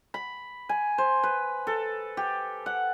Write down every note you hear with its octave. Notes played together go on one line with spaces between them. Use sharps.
B5
G#5
C5
B4
A4
G4
F#5